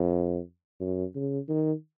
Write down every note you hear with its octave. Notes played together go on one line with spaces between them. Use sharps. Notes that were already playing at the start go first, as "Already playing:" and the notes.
Already playing: F2
F#2
C#3
D#3